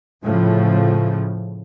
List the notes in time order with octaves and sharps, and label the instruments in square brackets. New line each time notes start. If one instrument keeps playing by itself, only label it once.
[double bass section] A2 C#3 F3